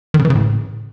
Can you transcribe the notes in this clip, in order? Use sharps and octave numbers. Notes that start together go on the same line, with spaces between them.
D#3
C#3
E3
C#3
A2